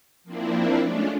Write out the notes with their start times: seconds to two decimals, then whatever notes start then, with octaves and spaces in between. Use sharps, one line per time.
0.24 F3 A#3 C4 D4 E4
0.82 G#3 A3 C#4 D4 F4